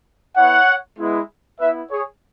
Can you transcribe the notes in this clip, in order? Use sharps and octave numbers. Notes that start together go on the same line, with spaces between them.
B3 E4 C#5 F#5
G#3 B3 E4
B3 E4 B4 E5
G#4 C#5